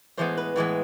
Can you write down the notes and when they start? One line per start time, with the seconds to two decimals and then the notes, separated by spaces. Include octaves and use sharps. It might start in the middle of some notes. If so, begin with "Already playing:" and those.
0.17 A2 E3 G#3 B3 C5
0.37 B4
0.56 A2 E3 G#3 B3